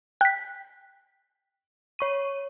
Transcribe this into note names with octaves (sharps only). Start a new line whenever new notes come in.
G5 F#6 B6
C#5 C#6 D#7